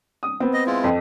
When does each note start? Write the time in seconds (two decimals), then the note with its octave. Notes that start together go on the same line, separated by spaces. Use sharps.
0.23 D#6
0.40 B3 C4
0.53 D#5
0.66 G#3 E4 F4
0.84 F2